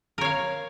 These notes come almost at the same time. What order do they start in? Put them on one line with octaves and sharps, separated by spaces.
A#4 C#5 F5